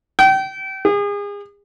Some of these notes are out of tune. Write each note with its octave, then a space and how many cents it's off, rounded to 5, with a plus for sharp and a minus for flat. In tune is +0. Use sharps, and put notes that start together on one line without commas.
G5 -30
G#4 -35